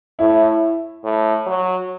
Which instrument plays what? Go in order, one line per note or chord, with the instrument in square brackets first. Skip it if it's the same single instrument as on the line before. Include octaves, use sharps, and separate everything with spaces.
[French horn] A2 [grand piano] E4
[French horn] A2
F#3